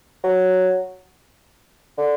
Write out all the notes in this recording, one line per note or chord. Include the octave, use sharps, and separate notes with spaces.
F#3
D3